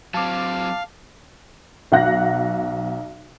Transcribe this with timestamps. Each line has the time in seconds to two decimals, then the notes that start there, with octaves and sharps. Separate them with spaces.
0.14 F#3 C4 F5 A5 D6
1.92 B1 F5 F#5 F#6 A#6